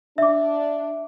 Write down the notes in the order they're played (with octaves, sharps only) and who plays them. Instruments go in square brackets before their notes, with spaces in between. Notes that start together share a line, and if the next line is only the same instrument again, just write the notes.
[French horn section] D4 [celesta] E5 D6